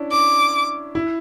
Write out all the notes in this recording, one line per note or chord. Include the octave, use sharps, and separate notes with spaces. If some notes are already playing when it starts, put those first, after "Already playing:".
Already playing: C#4 D4 E4
D6
E4